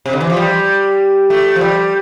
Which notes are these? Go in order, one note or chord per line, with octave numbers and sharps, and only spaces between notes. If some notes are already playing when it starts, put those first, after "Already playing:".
C3
D3
E3
F3
G3
A3
F3
G3